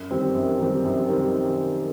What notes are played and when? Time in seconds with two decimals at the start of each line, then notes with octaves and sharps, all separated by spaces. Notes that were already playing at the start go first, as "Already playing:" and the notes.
Already playing: F#2
0.11 D#3 G3 C4
0.34 F#2
0.59 D#3 G3 C4
0.84 F#2
1.09 D#3 G3 C4